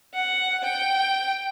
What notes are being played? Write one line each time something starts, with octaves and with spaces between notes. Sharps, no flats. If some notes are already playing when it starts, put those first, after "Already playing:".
F#5
G5